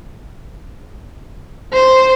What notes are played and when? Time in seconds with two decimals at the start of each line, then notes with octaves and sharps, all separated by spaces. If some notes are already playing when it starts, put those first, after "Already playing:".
1.73 C5